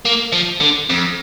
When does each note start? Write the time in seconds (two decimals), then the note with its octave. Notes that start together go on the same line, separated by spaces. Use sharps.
0.05 A#3
0.32 F3
0.60 D3
0.89 F2